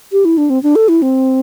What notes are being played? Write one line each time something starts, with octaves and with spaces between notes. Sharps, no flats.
G4
E4
D4
C4
D4
A4
E4
C4